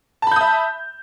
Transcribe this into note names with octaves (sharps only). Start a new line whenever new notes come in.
E5 A5 B5 D#6 G6